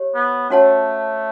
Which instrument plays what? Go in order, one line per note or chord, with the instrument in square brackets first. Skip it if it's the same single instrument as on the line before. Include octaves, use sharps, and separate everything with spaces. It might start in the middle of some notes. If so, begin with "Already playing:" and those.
Already playing: [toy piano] G4 C#5
[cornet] B3
[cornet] A3 [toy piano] C#4 F#4 C#5 F#5 A5